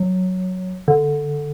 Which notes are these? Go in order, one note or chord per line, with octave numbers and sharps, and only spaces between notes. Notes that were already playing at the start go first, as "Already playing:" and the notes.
Already playing: F#3
D3